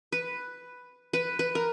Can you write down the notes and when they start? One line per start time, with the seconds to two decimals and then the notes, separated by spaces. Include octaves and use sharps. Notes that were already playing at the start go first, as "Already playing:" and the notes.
0.12 B4
1.13 B4
1.39 B4
1.55 A#4